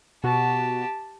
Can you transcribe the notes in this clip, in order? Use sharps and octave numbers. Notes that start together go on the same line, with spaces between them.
B2 F#4 G4 A5